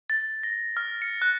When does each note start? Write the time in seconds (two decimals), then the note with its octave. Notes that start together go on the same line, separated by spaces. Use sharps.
0.10 A6
0.43 A#6
0.77 F6
1.02 C#7
1.22 F#6